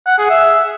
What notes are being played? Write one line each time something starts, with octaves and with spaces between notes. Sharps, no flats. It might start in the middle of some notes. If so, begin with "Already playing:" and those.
F#5
G#4
E5